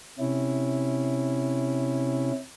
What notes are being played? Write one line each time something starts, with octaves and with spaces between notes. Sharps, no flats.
C3 C#4 E4